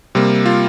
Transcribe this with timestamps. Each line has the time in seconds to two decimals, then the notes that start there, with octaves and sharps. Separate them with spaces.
0.15 C3 G3 A#3
0.46 F4